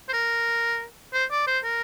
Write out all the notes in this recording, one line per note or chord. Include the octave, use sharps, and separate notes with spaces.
C5
A#4
C5
D5
C5
A#4